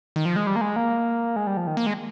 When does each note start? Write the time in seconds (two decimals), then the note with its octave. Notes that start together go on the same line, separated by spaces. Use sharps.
0.16 D#3
0.25 F3
0.36 G#3
0.47 G3
0.56 A#3
0.61 G#3
0.76 A#3
1.36 G#3
1.47 G3
1.57 F3
1.67 D#3
1.77 A#3
1.86 G#3